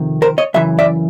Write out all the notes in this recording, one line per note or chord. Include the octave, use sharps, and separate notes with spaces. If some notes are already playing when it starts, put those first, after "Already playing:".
Already playing: F2 C3 D#3
A#4 C5
C#5 D#5
F#2 C#3 E3 E5
D5 E5